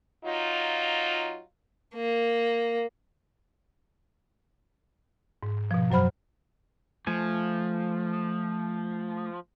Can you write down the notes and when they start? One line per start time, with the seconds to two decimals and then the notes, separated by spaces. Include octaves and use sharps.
0.24 F#3 D#4 F4
1.95 A#3
5.43 G#2
5.71 B2 F3
5.91 F#2 F#3 C5 B5 F6
7.07 F3 A3 G#5